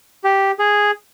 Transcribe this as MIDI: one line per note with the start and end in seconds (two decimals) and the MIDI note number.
0.24 0.51 67
0.59 0.91 68